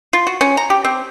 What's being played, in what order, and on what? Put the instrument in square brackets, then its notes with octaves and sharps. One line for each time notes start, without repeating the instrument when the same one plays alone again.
[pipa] F4
F#4
C#4
A#5
G4
C4